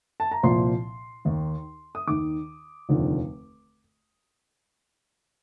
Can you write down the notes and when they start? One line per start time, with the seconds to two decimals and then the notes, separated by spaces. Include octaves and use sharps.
0.20 A5
0.31 A#5
0.43 C2 A#2 F3 C6
1.25 D#2 D#3
1.95 D#6
2.07 D#2 D#3 D6
2.89 F1 D#2 D3 F3